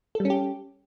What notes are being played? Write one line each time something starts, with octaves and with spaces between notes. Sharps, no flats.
G3 C#4 G4 A4